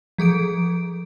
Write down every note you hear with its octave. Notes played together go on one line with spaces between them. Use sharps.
F3 G#4 A4 D7